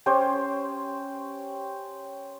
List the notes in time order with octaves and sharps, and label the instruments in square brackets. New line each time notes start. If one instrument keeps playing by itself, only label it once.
[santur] C#4 G4 C5